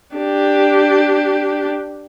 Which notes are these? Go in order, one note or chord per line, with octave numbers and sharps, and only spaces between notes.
D4 G4